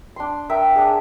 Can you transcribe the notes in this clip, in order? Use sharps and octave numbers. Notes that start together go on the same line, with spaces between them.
D4 C6
A#4 E5 G5
D4 G#4